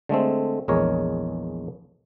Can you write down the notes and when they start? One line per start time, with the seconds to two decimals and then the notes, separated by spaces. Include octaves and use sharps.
0.09 D3 G#3 A3 C4
0.68 A#1 E2 G#3 A#4 C#5